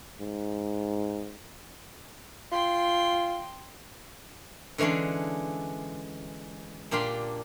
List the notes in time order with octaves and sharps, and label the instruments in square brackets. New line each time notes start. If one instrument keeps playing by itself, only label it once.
[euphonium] G#2
[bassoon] F4 [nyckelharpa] G5 C6
[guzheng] D3 E3 G#3 C#4 D4
A#2 D4 G4 F5 C6